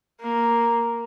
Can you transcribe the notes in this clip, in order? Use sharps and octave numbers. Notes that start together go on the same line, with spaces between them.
A#3